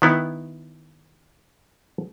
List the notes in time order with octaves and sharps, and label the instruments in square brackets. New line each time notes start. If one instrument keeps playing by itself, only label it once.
[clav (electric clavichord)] D#3 B3 E4